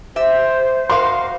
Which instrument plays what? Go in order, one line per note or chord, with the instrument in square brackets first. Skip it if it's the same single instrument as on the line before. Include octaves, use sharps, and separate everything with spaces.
[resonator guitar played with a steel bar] G4 E5 [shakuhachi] C5
[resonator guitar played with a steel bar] F#4 A#4 F5 [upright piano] C6